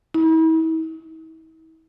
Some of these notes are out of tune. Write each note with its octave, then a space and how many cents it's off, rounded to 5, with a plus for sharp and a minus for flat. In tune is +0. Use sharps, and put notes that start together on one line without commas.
E4 -40